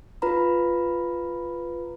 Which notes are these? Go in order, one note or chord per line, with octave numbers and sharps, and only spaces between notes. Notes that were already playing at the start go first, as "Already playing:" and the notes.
F4 B4 A#5 B5